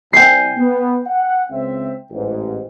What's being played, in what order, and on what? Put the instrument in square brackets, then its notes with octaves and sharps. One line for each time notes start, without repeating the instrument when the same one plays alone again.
[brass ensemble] C2 G#5 [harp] G5 C7
[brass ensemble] B3
F#5
C#2 C4 E5
A1 G#2